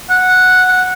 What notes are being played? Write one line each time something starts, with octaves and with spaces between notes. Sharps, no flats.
F#5
F#5